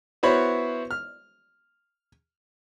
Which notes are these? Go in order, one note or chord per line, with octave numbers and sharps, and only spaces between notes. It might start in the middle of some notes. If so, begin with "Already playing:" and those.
B3 E4 F#4 C5 C#5 B5
F6